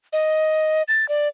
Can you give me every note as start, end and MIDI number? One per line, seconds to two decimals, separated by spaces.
0.13 0.83 75
0.88 1.08 93
1.09 1.28 74